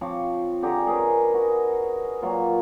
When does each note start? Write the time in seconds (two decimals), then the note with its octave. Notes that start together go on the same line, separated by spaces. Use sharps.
0.01 F3 C4 C#5 D6
0.63 D3 G4 G#4 A#5
0.87 G#4 A#4 B4 C#5
1.34 F#4
2.22 A#2 F#3 F4 C#5